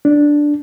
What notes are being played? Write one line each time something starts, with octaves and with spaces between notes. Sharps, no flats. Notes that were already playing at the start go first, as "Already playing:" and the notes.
D4